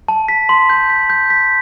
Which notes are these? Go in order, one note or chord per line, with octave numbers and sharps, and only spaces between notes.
A5
B6
C6
G6
B6
G6
B6